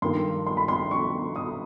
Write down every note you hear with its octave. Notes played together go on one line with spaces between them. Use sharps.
G2 D#3 G3 A#3 C6
C6
B5
C6
C#6
D#6